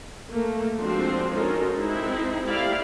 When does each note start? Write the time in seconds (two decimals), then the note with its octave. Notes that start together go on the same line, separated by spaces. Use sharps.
0.29 A3 A#3
0.78 F3 G#3 C4 D4 F#4 C5
1.32 C#4 D#4 F4 F#4 A4 A#4
1.73 G#3 C4 D#4 E4
2.47 A3 E4 G4 D5 F5